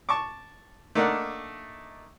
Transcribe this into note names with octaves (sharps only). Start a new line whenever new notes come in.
A5 C#6 D6
A3 A#3 D4 D#4 A#4 F#5